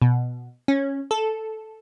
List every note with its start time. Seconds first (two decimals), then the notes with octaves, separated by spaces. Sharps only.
0.02 B2
0.68 C#4
1.11 A4